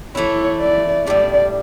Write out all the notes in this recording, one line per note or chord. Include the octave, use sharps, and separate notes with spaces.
E3 A3 E4 C#5
D5
A2 G3 D4 D5